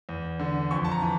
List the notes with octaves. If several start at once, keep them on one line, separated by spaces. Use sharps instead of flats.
E2
D3
F2 C#6
A5
A#5
E3